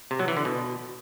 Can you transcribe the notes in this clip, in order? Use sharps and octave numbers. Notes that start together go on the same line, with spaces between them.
C3
F#3
E3
D3
B2